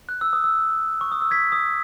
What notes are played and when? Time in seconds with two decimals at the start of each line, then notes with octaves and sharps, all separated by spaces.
0.09 F#6
0.21 E6
0.33 D#6
0.44 E6
1.01 C#6
1.12 D#6
1.22 E6
1.31 G#6 B6
1.52 D#6